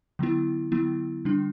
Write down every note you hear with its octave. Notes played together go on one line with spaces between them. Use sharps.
D3 F#3 B3 E4
D3 F#3 B3 E4
D3 G3 D4